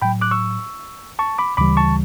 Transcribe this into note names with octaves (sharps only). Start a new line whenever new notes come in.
A2 F#3 G5 B5
D6 F#6
C#6 E6
A5 C#6
B5 D6
D2 C#3 E3 G3 B5 D6
A5 C#6